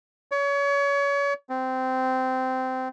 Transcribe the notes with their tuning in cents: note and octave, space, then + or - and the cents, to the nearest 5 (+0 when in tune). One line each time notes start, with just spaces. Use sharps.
C#5 +30
C4 -15